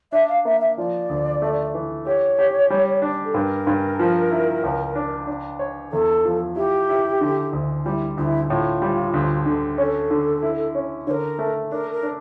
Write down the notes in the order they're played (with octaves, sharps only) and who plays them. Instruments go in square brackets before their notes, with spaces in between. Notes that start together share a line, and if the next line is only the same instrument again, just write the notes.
[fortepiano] D4 [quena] E5
[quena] F5
[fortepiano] A#3 [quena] E5
[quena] E5
[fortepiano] F3 [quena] D5
[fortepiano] D2
A3
E3
[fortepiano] G4 [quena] C#5
[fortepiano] G4
G3
D4
[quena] A4
[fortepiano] G2 [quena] A#4
[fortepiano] G2
F3
E4
C#2
D4
D4
C#5
[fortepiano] E2 [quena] A4
[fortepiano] F3
[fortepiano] E4 [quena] G4
[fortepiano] E4
D3
D2
[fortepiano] G3 [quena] E4 F4
[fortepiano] D2 [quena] F4
[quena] E4
[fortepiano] A2 [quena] F4
[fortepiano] G3
D2
D3
[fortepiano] C#4 [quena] A4
[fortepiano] D3
E4
C#4
[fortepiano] D3 [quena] C#5
[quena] A#4
[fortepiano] A3
[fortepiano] D4 [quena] A#4
[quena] A#4
[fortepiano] D4